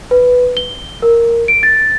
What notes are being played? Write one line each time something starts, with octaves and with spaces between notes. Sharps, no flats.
B4
G7
A#4
D7
A6